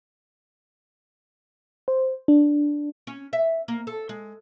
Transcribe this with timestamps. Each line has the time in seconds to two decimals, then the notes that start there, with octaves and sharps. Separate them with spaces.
1.88 C5
2.28 D4
3.07 C#4
3.33 E5
3.68 A#3
3.87 A4
4.09 G#3